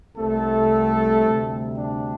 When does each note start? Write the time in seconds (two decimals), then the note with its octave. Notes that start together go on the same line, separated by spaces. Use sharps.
0.16 C2 C3 G3 A3 A4
1.23 D2 C3 G3
1.76 D4